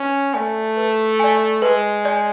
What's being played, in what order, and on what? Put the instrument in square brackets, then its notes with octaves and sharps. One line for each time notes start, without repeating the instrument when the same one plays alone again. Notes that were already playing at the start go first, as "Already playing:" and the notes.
Already playing: [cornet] C#4 [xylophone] B4
[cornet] A3 [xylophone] D5 G#5
[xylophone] B4
D5 G#5
[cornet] G#3 [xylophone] B4
[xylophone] D5 G#5